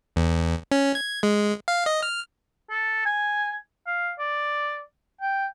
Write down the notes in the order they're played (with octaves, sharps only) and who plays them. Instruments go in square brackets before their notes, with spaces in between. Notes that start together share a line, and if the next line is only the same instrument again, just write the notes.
[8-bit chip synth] E2
C#4
G#6
G#3
F5
D#5
F6
[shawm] A4
G#5
F5
D5
G5